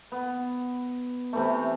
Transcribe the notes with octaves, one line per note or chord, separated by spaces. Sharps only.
B3
C3 E3 A3